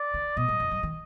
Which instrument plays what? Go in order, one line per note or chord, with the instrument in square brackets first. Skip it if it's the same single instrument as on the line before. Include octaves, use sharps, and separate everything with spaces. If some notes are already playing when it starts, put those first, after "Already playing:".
Already playing: [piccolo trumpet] D5
[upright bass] D3
[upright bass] B2 [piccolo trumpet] D#5
[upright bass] G2
F2
G2
D#3